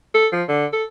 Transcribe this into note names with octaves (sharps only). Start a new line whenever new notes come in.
A4
F3
D3
A4